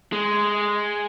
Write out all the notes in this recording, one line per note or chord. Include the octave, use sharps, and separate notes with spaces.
G#3